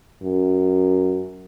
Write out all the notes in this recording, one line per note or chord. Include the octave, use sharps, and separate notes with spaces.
F#2